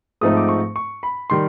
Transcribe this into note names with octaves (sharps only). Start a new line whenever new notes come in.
G#2 F3 A3 C4 D#4 D#6
D6
C#6
C#6
B5
D#3 G3 C6